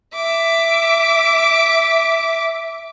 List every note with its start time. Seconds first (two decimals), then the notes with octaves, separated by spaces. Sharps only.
0.15 E5 D6